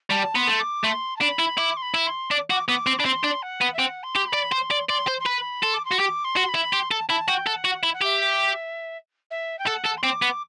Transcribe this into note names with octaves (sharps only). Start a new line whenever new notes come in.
G3 A5
B3 C6
A3
D6
A3 C6
A5
D4 B5
E4
E4 D6
C6
B5
E4
B5
C6
D4 D6
F#4 D6
B3 D6
C4
D4 B5
C4 C6
D4
F#5
B3
E5
C4 F#5
C6
G4
B5
D5
C5 C6
D5
D5 C6
C5
C6
B4 B5
A4 C6
D6
C6
F#4
G4 D6
C6
F#4
B5
E4
G4 C6
A4 A5
E4 A5
F#4 G5
A4 F#5
F#4
E4 E5
F#5
G4 E5
E5
G5
A4 F#5
A4
C6
C4 D6
B3